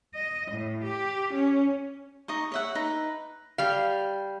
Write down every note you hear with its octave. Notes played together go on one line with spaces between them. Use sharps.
D#5
A2
G4
C#4
D#4 D#5 C#6
C#5 E5 F#5
D#4 B4
G3 F5